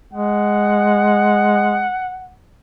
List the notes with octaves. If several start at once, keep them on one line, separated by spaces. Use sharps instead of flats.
G#3 F#5